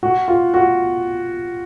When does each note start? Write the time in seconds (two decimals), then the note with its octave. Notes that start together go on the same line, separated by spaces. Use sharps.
0.03 F#4
0.28 F4
0.54 F#4